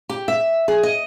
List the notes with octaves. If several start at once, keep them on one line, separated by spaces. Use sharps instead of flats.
G4
E5
G#4
D#5